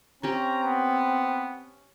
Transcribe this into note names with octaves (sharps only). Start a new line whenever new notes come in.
C4 C#4 G4 A#5
B3